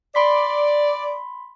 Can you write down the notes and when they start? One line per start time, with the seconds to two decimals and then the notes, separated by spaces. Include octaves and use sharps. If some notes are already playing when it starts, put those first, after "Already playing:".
0.15 D5 B5 C6 B6